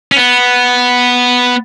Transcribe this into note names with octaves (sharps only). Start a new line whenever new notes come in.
C#4
B3